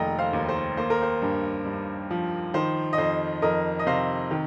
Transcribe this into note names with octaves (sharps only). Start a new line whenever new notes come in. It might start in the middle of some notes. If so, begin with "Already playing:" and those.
Already playing: F1 D#3 A#3 D#5 G5 A#5
C5 F5
D#2
C5
A#3 C5
A#4
C5
G2
G2
F3
D#3 C5
D#5
F2 C5
F2 A#4 D#5
D#5
C3 C5 F5
D#3